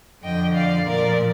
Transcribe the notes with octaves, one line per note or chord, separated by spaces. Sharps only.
F2 D3 F3 D#5 G5
D5 F5
A#2 F3 A#4 D5